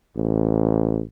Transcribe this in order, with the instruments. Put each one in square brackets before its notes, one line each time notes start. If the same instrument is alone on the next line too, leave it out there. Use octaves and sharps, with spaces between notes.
[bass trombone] A1